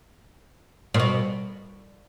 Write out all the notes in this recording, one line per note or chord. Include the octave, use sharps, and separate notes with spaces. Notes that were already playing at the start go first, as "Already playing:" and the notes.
A#2
B2